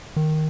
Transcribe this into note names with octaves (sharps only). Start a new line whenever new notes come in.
D#3